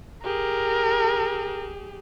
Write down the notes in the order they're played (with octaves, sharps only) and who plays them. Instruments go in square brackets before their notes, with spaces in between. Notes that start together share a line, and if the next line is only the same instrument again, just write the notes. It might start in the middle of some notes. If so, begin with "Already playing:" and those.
[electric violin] G4 G#4 [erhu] A#4